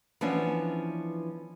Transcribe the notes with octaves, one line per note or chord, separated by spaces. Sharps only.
E3 F3 B3 C#4 D4